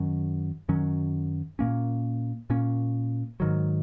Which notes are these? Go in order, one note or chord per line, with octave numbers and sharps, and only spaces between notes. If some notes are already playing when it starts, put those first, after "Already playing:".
Already playing: F#2 D#3 F#3 C#4
F#2 D#3 F#3 C#4
A#2 A#3 C#4
A#2 A#3 C#4
G#2 D#3 F#3